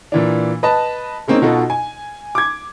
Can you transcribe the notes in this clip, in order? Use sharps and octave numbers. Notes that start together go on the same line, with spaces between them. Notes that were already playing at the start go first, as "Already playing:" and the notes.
A#2 E3 D4
B4 D#5 A5
G#3 A#3 C4 C#4 D#4
B2 D#4 F4 F#4 A4
G#5
D6 G#6